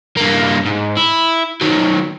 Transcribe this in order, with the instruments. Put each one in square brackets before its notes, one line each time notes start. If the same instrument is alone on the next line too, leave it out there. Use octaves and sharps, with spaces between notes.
[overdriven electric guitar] G2 A#3
G#2
E4
D#3 F#3